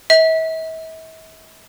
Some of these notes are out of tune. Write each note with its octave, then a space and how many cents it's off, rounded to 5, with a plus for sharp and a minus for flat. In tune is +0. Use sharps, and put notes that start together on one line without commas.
E5 -45